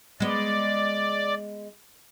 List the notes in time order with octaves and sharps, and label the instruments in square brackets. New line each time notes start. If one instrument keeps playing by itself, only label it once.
[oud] G#3 B3 [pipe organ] D5